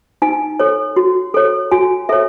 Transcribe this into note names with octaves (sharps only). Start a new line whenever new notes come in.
D#4 G#5
A4 C#5
F#4
A4 C#5
F#4 G#5
A4 C#5 E5